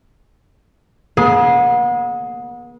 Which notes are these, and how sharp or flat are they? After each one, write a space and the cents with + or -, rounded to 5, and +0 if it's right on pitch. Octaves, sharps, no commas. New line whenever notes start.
B3 -40 G#4 +10